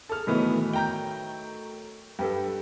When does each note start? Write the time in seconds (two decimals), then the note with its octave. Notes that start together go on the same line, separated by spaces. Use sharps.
0.09 G#4 A4 A5 F6
0.27 A2 D#3 E3 F#3 A3 B3
0.73 G5 A#5 G6
2.19 G2 A4 B4 G5